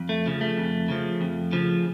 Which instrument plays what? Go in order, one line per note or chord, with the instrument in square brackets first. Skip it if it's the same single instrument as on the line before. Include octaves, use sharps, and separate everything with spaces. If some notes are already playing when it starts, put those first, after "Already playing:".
Already playing: [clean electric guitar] F2
A3
C#3 F3
A3
F2
C#3 F3
F2
C#3 F3